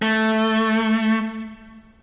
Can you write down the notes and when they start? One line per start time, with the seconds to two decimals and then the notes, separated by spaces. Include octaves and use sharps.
0.02 A3